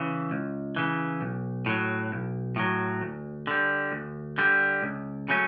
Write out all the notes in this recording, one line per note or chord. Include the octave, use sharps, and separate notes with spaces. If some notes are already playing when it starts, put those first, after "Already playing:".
Already playing: C#3 E3
C#2
C#3 E3
B1
A2 F#3
B1
A2 F#3
D2
D3 G3
D2
D3 G3
C#2
C#3 F#3 A3 C#4